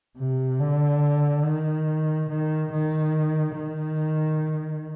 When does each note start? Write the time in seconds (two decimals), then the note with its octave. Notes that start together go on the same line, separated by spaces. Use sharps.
0.17 C3
0.59 D3
1.44 D#3
2.29 D#3
2.71 D#3
3.56 D#3